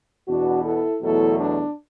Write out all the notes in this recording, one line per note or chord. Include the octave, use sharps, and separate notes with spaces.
E2 B2 B3 D4 F#4
E4 A4
E2 B2 F#3 A3 E4 A4
D4